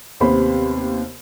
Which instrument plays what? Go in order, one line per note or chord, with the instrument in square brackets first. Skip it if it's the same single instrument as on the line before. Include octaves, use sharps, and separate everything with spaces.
[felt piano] D#2 C3 B3 G4 C5 B5